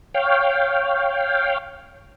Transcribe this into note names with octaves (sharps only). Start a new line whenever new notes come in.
C#5 F5 G5